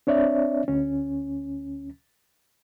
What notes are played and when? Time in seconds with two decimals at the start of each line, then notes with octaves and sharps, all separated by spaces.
0.07 C4 D4 C#5 D5 E5
0.68 D2 C#4